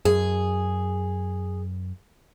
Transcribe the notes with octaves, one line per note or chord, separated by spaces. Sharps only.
F#2 G#4